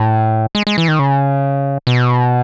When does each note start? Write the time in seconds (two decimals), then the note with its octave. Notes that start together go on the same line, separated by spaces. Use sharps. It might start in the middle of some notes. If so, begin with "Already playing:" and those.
Already playing: A2
0.55 G#3
0.67 G#3
0.78 E3
0.88 D#3
0.99 C#3
1.87 B2